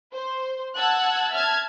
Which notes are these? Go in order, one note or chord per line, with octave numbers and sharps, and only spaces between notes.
C5
F#5 A5 E6 F#6 G#6
E5 A5 F6 G#6